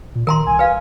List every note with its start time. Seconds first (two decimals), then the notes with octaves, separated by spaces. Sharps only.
0.15 A#2
0.27 D#3 A#4 A#5 C6
0.46 C2 G#5
0.59 B4 F5